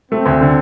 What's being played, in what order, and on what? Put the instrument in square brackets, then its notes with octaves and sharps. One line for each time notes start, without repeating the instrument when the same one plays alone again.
[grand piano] A3 [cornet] C4
[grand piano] D2
D3